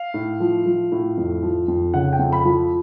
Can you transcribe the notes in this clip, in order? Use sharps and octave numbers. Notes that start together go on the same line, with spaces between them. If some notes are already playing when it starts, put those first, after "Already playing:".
Already playing: F5
A2
F3
F3
A2
F2
F3
F2
C#3 F#5
G5
F2
B5
F3